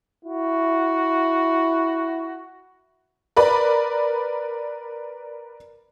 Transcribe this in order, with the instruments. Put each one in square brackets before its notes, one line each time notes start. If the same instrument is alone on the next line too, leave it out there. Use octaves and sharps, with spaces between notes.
[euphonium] E4 [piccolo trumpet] F#4
[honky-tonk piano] A#4 B4 D5 B5